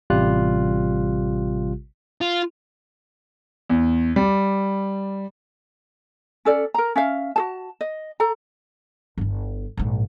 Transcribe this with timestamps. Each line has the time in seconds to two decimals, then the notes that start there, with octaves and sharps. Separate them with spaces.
0.10 A1 C3 G3 F4 G4 F#6
2.21 F4
3.69 E2
4.16 G3
6.45 C#4 A4 D5
6.74 A#4 A#5
6.96 C#4 E5 F5
7.36 F#4 G#4 A5
7.81 D#5
8.20 A4 A#5
9.18 G1 E4
9.77 A#1 G#2